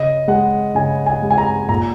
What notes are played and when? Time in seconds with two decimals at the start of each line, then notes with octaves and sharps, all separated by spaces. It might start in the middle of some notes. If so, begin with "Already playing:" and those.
Already playing: C#3 D#5
0.28 G#3 F#5
0.75 C#3 G#5
1.06 G#5
1.22 G#3
1.30 G#5
1.38 A#5
1.69 A#2 A#5